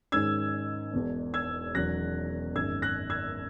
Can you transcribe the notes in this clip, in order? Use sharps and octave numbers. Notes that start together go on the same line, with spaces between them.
G#2 D#3 G#3 C#4 E6 G#6
E1 E2 B2
E6 G#6
E1 E2 D#3 F#3 C#4 F#6 A#6
G#1 F#2 D#3 G#3 E6 G#6
F#6 A#6
E6 G#6